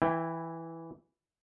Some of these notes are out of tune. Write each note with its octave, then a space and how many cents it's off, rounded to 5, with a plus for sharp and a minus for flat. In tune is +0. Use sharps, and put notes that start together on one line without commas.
E3 +0 E4 +0 G5 +20